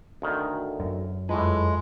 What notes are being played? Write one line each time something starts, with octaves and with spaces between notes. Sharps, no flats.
D2 D#3
F#2
F2 A2 G#3 B4